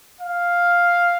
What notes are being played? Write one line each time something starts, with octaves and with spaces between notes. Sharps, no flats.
F5